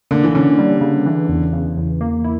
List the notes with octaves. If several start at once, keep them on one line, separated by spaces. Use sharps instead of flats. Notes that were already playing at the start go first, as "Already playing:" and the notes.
D3 A#3
E3
D3 C#4
G3
C#3
E3
E2
C#3
E2
A#3
E4